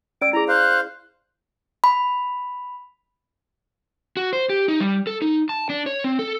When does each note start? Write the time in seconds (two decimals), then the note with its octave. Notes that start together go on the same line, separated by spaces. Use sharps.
0.21 C#4 D5 E6 D7
0.33 E4 G#4 A#5
0.48 C5 F5 F#6
1.84 B5
4.17 F#4
4.33 C5
4.49 G4
4.68 D#4
4.80 G3
5.07 A4
5.22 D#4
5.49 A5
5.70 D4
5.86 C#5
6.04 C4
6.19 A4